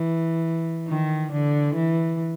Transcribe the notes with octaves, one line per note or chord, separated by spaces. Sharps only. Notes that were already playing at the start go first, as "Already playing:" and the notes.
Already playing: E3
D#3
D3
E3